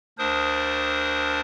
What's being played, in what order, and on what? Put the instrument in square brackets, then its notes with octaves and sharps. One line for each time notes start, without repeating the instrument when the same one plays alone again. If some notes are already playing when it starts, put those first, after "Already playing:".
[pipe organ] D2 D4 A#4 C5 D#6